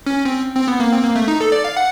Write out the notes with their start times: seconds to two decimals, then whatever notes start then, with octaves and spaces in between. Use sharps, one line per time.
0.06 C#4
0.25 C4
0.56 C4
0.68 B3
0.80 A#3
0.92 C4
1.03 A#3
1.16 A3
1.28 D#4
1.41 A4
1.52 D5
1.64 F5
1.77 F#5